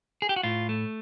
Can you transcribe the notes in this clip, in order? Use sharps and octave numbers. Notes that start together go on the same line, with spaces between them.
G#4
G4
F#4
A2 F4
A3